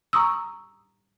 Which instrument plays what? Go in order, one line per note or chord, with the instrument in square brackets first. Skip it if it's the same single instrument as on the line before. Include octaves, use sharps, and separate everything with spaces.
[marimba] A#5 C#6 D#6 E6